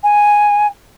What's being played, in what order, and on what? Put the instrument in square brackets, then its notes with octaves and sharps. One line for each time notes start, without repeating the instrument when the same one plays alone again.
[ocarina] G#5